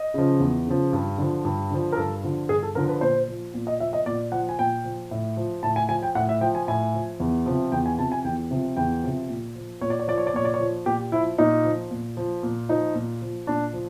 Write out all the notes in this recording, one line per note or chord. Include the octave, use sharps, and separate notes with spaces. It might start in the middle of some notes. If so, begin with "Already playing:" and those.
Already playing: D#5
C#3 F3
E2
C#3 F3
G2
D3 F3
G2
D3 F3
A#4
G2 A4
D3 F3
G2 G#4
A4
D3 F3 A#4
B4
A#2 C5
F3
A#2
D#5
F3 E5
D#5
A#2 D5
F3 F#5
G#5
A#2 G5
F3
A2
F3
A2 A5
G#5
F3 G#5
G5
A2 F#5
E5
F3 G5
G#5
A2 G#5
F3
E2
C3 F3
E2 G5
G#5
C3 F3 A5
G#5
E2 G5
C3 F3
E2 G5
C3 F3
A#2
F3
A#2 C#5
D5
C#5
F3 D5
C#5
D5
A#2 C#5
D5
C#5
F3
A#2 G4
F3 E4
A#2 D#4
F3
A#2
F3
A#2
F3 D#4
A#2
F3
A#2 D4
F3